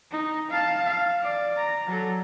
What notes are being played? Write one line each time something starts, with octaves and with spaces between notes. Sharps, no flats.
D#4
F5 A5
F5
D5
A#5
F#3 A4